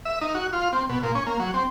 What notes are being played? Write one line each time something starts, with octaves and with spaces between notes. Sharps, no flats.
E5
D#4
F#4
F4
C4
B2
A#2
C#4
A#3
F#3
C4